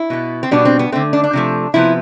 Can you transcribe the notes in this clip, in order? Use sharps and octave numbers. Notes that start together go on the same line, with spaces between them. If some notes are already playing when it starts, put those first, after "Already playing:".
Already playing: E4
B2 B3
C4
B2 G3 B3 D4
C4
B3
D3 A3 C4
D4
D4
C3 F3 A3
C3 F3 B3 E4